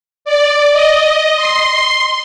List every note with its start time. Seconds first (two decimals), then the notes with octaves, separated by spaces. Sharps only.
0.25 D5
0.72 D#5
1.37 C6